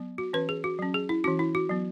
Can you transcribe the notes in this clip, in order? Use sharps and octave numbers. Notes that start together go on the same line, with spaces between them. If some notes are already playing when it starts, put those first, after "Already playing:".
Already playing: F#3 B3
F#4
E3 C#4 B4
G#4
F#4
F#3 C#4
G#4
E4
E3 C#4 F#4
E4
F#4
F#3 B3